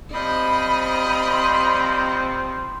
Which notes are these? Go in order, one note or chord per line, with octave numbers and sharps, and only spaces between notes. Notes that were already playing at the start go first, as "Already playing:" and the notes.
F3 G3 C4 D#5 B5
C6